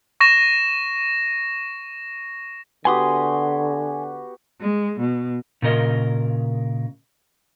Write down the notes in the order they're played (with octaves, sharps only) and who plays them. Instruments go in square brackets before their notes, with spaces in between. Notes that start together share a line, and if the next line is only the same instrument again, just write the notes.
[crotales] C#6 A#6 E7
[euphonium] D3 [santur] B3 F#4 G4 [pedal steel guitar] G#5 C6 D#6
[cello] G#3
B2
[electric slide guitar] A#2 C#3 A#4 D#5